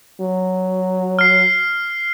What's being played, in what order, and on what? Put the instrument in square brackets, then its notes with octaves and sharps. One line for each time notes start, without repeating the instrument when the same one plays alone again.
[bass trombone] F#3
[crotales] F6 C7